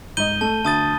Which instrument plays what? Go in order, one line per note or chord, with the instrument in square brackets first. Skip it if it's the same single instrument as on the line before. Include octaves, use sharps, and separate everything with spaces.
[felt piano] G#2 D#5 [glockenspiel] G6 D#7 G7
[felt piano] A3 [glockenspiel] A5
[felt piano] D2 [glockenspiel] A5 D#6 A6